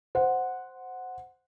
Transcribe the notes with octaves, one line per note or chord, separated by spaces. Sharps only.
C5 F#5